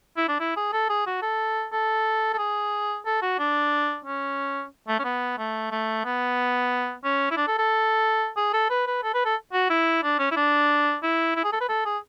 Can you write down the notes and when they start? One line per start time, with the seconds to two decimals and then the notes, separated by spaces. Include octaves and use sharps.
0.17 E4
0.28 D4
0.40 E4
0.56 G#4
0.73 A4
0.89 G#4
1.06 F#4
1.22 A4
1.72 A4
2.33 A4
2.38 G#4
3.06 A4
3.22 F#4
3.39 D4
4.05 C#4
4.88 A3
4.99 C#4
5.04 B3
5.38 A3
5.71 A3
6.05 B3
7.04 C#4
7.31 E4
7.37 D4
7.48 A4
7.59 A4
8.37 G#4
8.53 A4
8.70 B4
8.87 B4
9.03 A4
9.14 B4
9.25 A4
9.53 F#4
9.70 E4
10.03 D4
10.19 C#4
10.31 E4
10.36 D4
11.03 E4
11.36 E4
11.44 G#4
11.52 A4
11.61 B4
11.69 A4
11.85 G#4